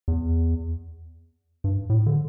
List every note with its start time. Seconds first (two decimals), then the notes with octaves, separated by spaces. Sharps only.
0.08 E2
1.64 G2
1.90 A2
2.06 D3